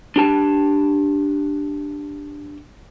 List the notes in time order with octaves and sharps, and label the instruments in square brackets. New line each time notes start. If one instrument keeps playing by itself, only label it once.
[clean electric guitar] D4 G4 A5